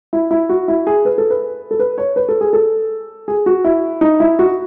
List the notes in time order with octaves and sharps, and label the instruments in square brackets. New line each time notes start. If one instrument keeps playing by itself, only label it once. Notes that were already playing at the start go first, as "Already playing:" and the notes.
[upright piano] E4
E4
F#4
E4
G#4
B4
A4
B4
A4
B4
C#5
B4
A4
G#4
A4
G#4
F#4
E4
D#4
E4
F#4